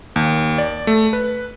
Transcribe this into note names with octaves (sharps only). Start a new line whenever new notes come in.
D#2
D5
A3
B4